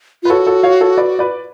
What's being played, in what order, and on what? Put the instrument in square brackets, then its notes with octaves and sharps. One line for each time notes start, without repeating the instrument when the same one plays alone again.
[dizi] F4 [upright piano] B4
[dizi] F#4 [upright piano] A4 C#5
[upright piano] A4 C#5
C#5 F5
A4 C#5
B4 D5
B4 D5